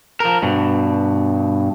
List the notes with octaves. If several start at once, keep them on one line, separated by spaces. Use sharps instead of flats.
F3 A#4
G2 B2